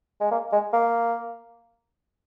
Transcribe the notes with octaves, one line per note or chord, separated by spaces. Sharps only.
G#3
A#3
G#3
A#3